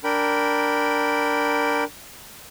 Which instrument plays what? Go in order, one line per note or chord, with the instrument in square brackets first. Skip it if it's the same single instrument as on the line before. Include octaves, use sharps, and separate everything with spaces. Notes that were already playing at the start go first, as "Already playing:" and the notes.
[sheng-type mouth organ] D4 A#4 G5 B5